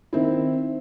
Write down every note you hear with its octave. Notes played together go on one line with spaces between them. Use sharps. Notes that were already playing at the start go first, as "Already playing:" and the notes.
D#3 C4 E4